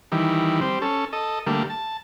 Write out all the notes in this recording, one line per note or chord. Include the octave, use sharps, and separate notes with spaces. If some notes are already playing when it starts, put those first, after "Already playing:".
D#3 E3 G3
G3 C4
C#4 A4
A4 D#5
D3 G3 A3 A#3
A5